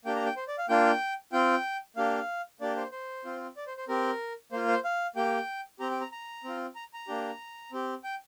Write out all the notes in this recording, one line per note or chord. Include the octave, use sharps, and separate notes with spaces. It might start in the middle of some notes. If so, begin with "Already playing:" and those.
A#3 D4 G4 G5
A#5
G5
C5
D5
F5
A#3 D4 F4 G5
C4 F4 G5
A#3 D4 G4 F5
A#3 D4 G4 D5
C5
C5
C4 F4
D5
C5
C5
C4 G4 A#4
A#3 F4 C5
C5
F5
A#3 G4 G5
C4 G4 A#5
G5
A#5
A#5
C4 F4
A#5
A#5
A#3 D4 G4
C4 G4
G5